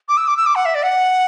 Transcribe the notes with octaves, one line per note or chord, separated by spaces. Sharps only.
D6
E6
D6
E6
D6
F#5
E5
D5
F#5